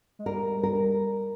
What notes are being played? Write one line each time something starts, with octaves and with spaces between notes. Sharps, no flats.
G#3
G3 A#4
A#4